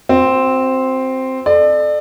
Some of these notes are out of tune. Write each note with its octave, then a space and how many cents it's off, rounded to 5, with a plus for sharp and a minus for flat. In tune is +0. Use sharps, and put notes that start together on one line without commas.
C4 +0 F#4 -40
A4 -20 D5 +35